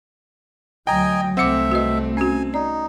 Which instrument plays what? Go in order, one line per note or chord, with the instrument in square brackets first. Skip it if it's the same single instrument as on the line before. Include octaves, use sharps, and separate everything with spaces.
[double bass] D2 F#3 [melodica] D#5 G#5 [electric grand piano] G5 A#5
[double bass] C2 A3 [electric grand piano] C4 C#7 [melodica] E5 [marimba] F#5 D6
[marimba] F#4 B4 D#5
[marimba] C#4 F#4 [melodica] G#5
[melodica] D#4 [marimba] D5